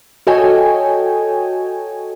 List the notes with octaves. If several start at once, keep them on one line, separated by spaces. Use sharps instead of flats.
F#4 A4 C#5 D#5 G5 G#5